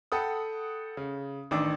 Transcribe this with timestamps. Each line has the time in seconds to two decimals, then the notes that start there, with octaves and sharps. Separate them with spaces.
0.12 A4 F#5 G5 B5 D#6
0.97 C#3
1.51 A1 D#3 D4 D6 E6